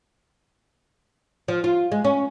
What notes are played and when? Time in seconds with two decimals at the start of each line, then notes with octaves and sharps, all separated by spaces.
1.48 F3
1.64 F4
1.92 G#3
2.04 C#4